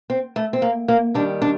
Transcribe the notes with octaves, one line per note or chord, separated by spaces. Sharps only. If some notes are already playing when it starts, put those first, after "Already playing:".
C4
A3
C4
A#3
A#3
D#2 D#3 G3 D4
D4